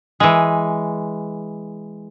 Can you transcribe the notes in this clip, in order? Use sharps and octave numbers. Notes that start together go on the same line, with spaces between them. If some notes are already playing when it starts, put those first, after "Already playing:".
E3 G#3